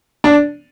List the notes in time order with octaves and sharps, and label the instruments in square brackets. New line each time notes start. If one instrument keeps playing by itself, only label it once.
[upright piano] D4